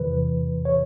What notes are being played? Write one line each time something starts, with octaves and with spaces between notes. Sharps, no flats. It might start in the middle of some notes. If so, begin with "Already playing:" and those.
Already playing: E2 C3 E3 B4
C#5